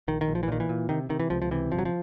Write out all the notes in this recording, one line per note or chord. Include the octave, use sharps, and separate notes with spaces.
A#1 D#3
D#3
A#1
F3
E3
A#2 D#3
E3
A#2
C3 D#3
C3 D#3
E3
C#2 F3
F3
C3 E3
G1 F3
F#3
F3